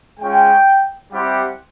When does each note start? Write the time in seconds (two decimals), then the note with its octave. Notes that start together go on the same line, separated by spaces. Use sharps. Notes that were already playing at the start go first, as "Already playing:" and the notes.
0.20 G#3 C#4 F4 G5
1.11 G3 C4 E4 G4 F#5